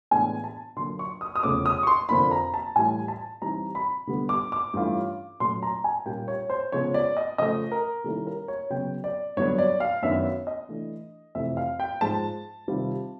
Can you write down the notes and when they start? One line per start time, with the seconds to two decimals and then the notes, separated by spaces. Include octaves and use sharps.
0.11 A2 E3 G#3 B3 D4 G#5
0.44 A5
0.76 D3 F#3 A#3 C6
0.99 C#6
1.21 D#6
1.36 D#6
1.43 E2 C#3 F3 A3 C#4 D6
1.66 D#6
1.83 C#6
1.87 C6
2.09 F2 D3 F3 A#3 D4 B5
2.31 A#5
2.54 A5
2.76 A2 E3 G3 G#5
3.08 A5
3.42 E3 G3 C4 D#4 A#5
3.75 B5
4.07 D3 G3 B3
4.29 D6
4.52 D6
4.74 G2 E3 A3 C#4 F4
5.40 A#2 F#3 A3 C#4 C6
5.63 A#5
5.84 G#5
6.06 A#2 G3 A#3 C#4 F4 G5
6.28 C#5
6.50 C5
6.72 C#3 F3 G#3 B3 C#5
6.94 D5
7.17 D#5
7.38 C#3 F3 A3 D#5
7.72 A#4
8.04 D#3 G3 A#3 C#4 E4 A4
8.27 A#4
8.48 C#5
8.70 C#3 F#3 B3 G5
9.04 D5
9.37 G2 D3 F#3 B3 D4 C#5
9.58 D5
9.80 F5
10.02 F#2 D#3 F#3 B3 D4 E5
10.47 D#5
10.69 E3 A3 D4
11.35 F2 C3 E3 A3 E5
11.57 F5
11.80 G5
12.01 G#2 F3 G#3 A5
12.68 C3 D#3 G3 C4 F4